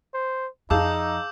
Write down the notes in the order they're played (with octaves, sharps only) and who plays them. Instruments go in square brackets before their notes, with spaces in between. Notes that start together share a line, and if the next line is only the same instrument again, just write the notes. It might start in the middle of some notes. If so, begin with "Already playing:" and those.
[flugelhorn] C5
[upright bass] F2 [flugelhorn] D#4 [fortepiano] G#4 F5 A5 [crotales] D6 E6 G6